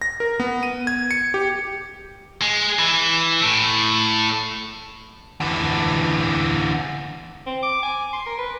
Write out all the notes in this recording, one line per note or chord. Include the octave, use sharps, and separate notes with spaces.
A#6
A#4
B3
D#7
G#6
C#7
G4
G#3
E3
A2
D3 E3
C4
D6
G#5
C6
A#4
B4